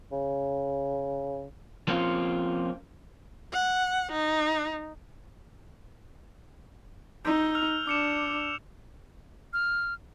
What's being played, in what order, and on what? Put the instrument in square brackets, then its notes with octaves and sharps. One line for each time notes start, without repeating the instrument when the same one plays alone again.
[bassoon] C#3
[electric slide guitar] F3 A#3 C4 C#4 F4
[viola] F#5
D#4
[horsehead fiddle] D#4 [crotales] E6 G6
[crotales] E6 F6 F7
[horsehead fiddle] D4 [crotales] D6 C#7 E7
[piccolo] F6